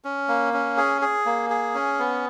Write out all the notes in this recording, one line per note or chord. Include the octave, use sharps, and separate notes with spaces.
C#4
A#3
C#4
G#4
G#4
A#3
G#4
C#4
B3